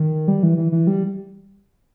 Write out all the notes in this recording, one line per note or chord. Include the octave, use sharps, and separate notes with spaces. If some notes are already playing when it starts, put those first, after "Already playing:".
Already playing: D#3
G3
E3
E3
E3
G3